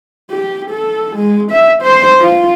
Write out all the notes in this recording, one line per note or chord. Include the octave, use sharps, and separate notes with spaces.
G4
A4
G#3
E5
C5
F4